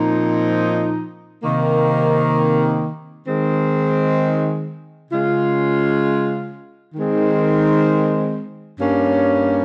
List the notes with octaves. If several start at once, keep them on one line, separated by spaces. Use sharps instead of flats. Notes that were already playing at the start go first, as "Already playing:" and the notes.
Already playing: A#2 F3 C4 D#4
C3 D#3 A#3
D#3 G#3 C4
C#3 G#3 C#4 F4
D#3 G#3 C4
G2 G3 A#3 C#4